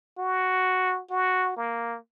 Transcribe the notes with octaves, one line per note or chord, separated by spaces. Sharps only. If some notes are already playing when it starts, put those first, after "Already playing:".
F#4
F#4
A#3